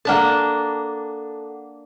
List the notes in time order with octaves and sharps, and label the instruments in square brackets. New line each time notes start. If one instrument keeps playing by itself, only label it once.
[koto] A#3 D4 A5 [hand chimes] A4 F#5